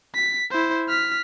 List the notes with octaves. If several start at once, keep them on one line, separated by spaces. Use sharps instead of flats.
B6
E4 C5
F6 B6